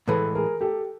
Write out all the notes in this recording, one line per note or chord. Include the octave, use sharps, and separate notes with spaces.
A2 E3 G#3 A4 B4
G#4 A#4
G4 A4